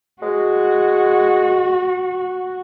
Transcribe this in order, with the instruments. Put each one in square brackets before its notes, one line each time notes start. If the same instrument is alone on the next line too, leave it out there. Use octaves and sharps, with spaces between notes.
[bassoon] G#3 [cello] F#4